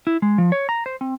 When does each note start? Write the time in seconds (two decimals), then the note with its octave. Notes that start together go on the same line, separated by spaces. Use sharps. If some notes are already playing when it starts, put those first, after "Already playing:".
0.07 E4
0.22 G#3
0.38 F3
0.52 C#5
0.69 A#5
0.86 C5
1.01 C4